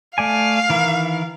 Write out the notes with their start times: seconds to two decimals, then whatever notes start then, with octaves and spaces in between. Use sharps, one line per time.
0.18 A3 D5 F5 G#5
0.69 D#3 E3 A#4